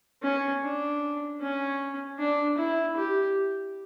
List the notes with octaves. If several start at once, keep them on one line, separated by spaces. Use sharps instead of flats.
C#4
D4
C#4
D4
E4
G4